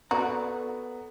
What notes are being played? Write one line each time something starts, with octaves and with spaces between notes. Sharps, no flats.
B3 F#4 A4 D5 A#5